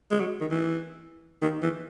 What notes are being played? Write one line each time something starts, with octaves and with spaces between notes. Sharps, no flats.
G#3
F#3
D#3
E3
D#3
E3